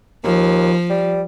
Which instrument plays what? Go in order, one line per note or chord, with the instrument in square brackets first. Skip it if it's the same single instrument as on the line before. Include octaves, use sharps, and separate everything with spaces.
[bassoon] D#2 [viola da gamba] F3
[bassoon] G3